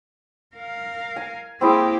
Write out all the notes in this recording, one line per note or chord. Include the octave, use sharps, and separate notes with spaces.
A#4 F5
G#5
A#3 C4 E4 G4 G#4